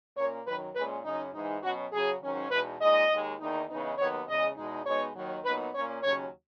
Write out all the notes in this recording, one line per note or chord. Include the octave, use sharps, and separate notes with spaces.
A#2 A#3 C#4 C#5
F#2 D#3 F#3 B4
A#2 G#3 C#4 B4
F#2 C#3 F#3 C#4 D#4
G#2 E3 G#3 D#4
B2 F#3 C#4 F#4
C#3 F#3 C#4 G#4
G#2 D#3 F#3 C#4
E2 B2 G#3 D#4 B4
A#2 G#3 D#4 D#5
D#2 D#3 G#3
E2 D#3 A#3 D#4
C#3 E3 B3 D#4
D#2 D#3 F#3 B3 C#5
E2 C#3 G#3 D#5
E2 B2 G#3 D#4
B2 G#3 B3 D#4 C#5
D#2 D#3 F#3
A#2 F#3 B3 D#4 B4
A#2 A#3 C#4 C#5
D#2 C#3 F#3 C#4 C#5